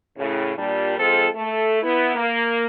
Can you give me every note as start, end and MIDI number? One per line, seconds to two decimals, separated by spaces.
0.17 0.51 45
0.17 0.51 49
0.57 0.95 46
0.57 0.95 55
0.57 0.95 62
0.97 1.26 53
0.97 1.26 56
0.97 1.26 60
0.97 1.26 65
0.97 1.26 69
1.35 1.78 57
1.35 1.78 69
1.81 2.12 59
1.81 2.12 64
2.16 2.66 58